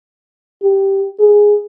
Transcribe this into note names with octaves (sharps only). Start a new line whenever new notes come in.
G4
G#4